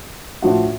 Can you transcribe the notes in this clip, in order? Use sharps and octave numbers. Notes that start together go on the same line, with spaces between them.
A2 F3 A3 D4 F#4